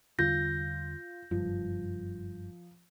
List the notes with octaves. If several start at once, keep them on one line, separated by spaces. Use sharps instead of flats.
E2 D3 G3 F4 G6 A#6
F#1 G2 F3